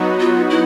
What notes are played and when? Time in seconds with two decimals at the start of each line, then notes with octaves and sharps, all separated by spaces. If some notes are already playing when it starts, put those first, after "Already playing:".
Already playing: F#3 B3 D#4 F#4
0.20 F4
0.50 E4